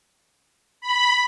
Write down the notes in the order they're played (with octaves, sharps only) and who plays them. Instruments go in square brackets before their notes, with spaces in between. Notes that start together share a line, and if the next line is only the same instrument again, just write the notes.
[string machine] B5